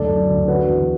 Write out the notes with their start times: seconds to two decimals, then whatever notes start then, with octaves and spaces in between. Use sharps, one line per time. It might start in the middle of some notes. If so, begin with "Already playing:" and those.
Already playing: F#1 D2 A4 D5
0.09 F#3
0.29 D2
0.48 D3 F#4 B4
0.68 E2